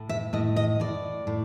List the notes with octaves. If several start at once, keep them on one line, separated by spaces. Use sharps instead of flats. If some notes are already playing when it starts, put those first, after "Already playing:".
Already playing: A2
E5
A2 D#5
D#5
A2 D5
A2